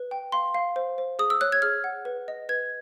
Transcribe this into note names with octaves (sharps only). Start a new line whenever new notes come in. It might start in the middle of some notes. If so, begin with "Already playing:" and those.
Already playing: B4
G5
F5 C6
F5
C5
C5
G#4 D#6
E6
C#5 F#6
G#6
G#4 F6
F#5
B4
D#5
B4 G#6